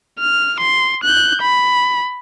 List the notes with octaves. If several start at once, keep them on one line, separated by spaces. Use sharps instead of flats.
F6
C6
F#6 G6
B5